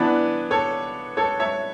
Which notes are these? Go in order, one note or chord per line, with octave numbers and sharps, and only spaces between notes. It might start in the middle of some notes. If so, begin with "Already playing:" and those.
Already playing: E3 B3 D4 B4 D5
A4 C#5
A4 C#5
C#5 E5